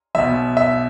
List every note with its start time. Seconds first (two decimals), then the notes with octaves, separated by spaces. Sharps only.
0.15 B1 B2 E5
0.57 E5